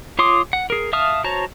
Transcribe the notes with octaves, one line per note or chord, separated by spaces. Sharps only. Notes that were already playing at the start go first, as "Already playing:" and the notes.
F4 C#5 C6 D6 D#6
F#5
G#4 A#4
E5 F5 A5 D#6 F6
F#4 C5 C#5 A5 A#5